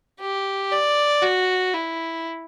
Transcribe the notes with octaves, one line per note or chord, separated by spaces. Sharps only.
G4
D5
F#4
E4